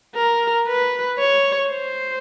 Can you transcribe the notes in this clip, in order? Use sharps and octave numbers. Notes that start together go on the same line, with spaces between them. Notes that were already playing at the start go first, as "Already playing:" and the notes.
A#4
B4
C#5
C5